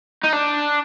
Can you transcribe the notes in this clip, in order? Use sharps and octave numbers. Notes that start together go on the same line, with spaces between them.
D#4
D4